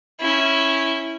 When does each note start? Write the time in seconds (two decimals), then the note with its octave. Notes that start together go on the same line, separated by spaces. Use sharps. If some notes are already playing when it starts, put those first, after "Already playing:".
0.20 C#4 E4